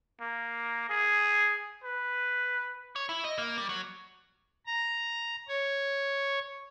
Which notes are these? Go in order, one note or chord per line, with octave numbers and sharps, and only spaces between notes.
A#3
G#4
B4
C#5
E4
D#5
A#3
G3
F#3
A#5
C#5